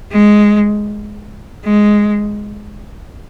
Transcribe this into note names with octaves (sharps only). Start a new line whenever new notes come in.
G#3
G#3